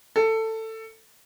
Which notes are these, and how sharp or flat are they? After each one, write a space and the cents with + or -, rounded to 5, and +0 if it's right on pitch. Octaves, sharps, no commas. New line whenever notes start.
A4 +15